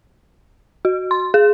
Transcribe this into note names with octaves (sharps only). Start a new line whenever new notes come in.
F#4
C6
G#4